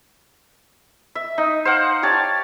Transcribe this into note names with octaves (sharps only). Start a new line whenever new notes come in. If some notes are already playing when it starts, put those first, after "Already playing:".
E5
D#4
C5 F5 F#5
G4 C#5 D5 A5